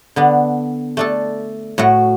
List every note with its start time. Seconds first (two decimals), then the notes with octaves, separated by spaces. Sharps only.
0.16 D3 B3 D4
0.97 A3 D4 A4
1.78 A2 A3 F#4